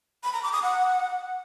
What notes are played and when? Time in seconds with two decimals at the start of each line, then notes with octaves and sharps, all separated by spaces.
0.23 B5
0.33 A#5
0.43 D6
0.53 D#6
0.63 F#5